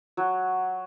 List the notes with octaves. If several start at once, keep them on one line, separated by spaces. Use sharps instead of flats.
F#3